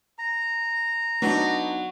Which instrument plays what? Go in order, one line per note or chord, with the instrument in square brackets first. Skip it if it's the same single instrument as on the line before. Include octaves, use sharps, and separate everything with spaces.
[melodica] A#5
[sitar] F#3 [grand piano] B3 D4 D#4